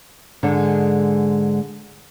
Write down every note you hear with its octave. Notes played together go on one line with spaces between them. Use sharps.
G#2 D3 G#3